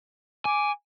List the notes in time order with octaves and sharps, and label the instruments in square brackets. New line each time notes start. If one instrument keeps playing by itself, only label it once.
[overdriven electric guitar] G#5 [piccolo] D6